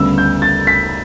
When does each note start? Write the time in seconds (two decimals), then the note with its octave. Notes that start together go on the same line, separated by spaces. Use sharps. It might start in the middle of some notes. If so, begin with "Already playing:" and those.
Already playing: D2 C#3 G3 B3 E6
0.18 G6
0.42 A6
0.67 B6